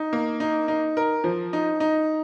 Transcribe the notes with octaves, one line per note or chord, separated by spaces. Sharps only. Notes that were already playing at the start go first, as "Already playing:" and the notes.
Already playing: D#4
A#3
D#4
D#4
A#4
F3
D#4
D#4